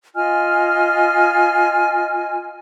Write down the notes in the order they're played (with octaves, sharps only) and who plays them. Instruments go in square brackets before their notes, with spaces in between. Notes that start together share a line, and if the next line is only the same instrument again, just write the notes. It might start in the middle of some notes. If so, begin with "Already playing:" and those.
[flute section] F4 D#5 G#5 F6